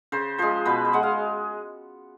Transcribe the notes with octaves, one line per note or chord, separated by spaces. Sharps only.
C#3 C5
F3 G#3 C5
B2 B4
C5
G#3 F#5
F5